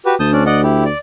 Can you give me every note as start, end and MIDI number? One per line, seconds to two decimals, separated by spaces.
0.05 0.15 66
0.05 0.15 67
0.05 0.15 71
0.20 0.89 38
0.20 0.31 81
0.20 0.31 87
0.20 0.31 91
0.32 0.44 61
0.32 0.44 62
0.32 0.44 74
0.46 0.61 74
0.46 0.61 75
0.46 0.61 78
0.63 0.84 64
0.63 0.84 67
0.85 0.98 74